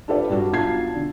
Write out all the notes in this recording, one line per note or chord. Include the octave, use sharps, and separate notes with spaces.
D4 F4 G4 A4 B4 D5
G2 G3 D4 F#4
B1 D4 F4 A5 G#6 C7
D3